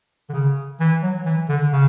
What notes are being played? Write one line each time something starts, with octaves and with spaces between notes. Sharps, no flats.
D3
C#3
E3
F#3
E3
D3
C#3